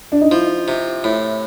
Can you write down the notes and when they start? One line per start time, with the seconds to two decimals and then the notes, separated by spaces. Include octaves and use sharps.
0.12 D4
0.21 D#4
0.31 F3 E4
0.68 C3
1.04 A2